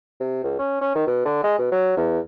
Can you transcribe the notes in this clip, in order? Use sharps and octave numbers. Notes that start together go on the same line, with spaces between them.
C3
C#2
C#4
C#4
D#3
B2
D3
G#3
B2
F#3
E2